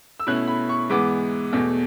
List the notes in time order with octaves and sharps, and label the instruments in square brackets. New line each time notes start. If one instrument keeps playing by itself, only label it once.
[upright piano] E6
B2 A3 C#4 E4 F#6
B5
C#6
G#2 E3 G#3 B3 D6
E2 B2 A3